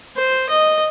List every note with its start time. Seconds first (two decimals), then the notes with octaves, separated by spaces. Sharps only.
0.17 C5
0.49 D#5